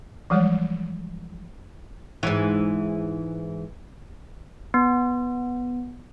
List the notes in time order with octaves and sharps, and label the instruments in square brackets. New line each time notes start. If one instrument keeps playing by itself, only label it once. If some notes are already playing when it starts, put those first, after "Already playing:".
[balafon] E3 F3 G3 G#3 C#5
[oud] G#2 E3
[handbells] B3